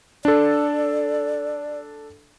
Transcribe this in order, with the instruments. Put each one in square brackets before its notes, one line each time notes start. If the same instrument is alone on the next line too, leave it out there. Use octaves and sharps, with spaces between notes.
[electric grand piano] D4 A4 [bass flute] D5